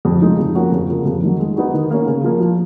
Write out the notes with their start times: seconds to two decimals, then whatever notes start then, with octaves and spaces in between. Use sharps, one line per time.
0.05 F2
0.22 C#3 F3 G#3 D#4
0.38 F2
0.55 F3 A#3 C#4 F#4
0.72 F2
0.89 C#3 F3 A#3
1.05 F2
1.22 D#3 F#3
1.40 G#3
1.56 B3 D#4 F#4
1.74 D#3
1.91 A#3 C#4
2.06 C#3
2.24 F3 A#3
2.40 F3